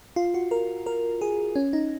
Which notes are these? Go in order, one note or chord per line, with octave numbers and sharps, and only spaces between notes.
F4
F#4
A#4
A#4
G#4
C#4
D#4